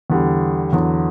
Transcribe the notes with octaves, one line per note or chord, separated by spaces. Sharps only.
E2 D3 G3
E2 D3 F#3